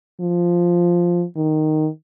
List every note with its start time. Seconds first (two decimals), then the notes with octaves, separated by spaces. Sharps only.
0.20 F3
1.36 D#3